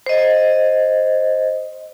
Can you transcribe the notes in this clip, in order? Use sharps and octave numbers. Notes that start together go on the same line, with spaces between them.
C5 D#5